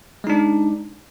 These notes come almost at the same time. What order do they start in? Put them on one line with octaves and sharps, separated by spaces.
G#3 D#4 D4